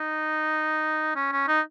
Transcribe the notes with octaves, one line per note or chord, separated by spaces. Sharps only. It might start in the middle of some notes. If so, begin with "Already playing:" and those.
Already playing: D#4
C#4
C#4
D#4